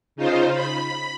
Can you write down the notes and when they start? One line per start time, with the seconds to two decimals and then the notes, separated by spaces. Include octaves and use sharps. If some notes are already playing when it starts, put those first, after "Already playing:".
0.16 C#3 D#4 F4 C5
0.53 B5